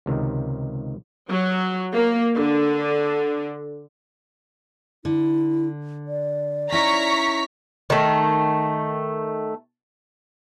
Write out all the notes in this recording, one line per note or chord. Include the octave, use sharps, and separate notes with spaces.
C#2 C3 D#3
F#3
A#3
D3
D3 E4
D5
C#4 D#4 E4 A#5 C#6 B6
D#3 A3